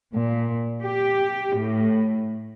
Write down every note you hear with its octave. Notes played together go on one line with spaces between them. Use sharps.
A#2
G4
A2